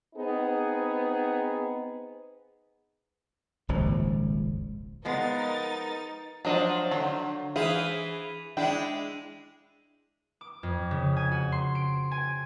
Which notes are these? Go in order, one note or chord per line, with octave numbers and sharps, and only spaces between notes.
B3 C4 D#4 G#4
D#1 G#1 C#2 F3
F3 G#3 B3 D#4 A#4 A6
F3 F#3 D4 D#5 F#5
D3 F#3
E3 E4 G#4 C5 F5
G#3 D4 E4 G5
D6
F2
C#3
G#5
F#4
C6
D7
G#5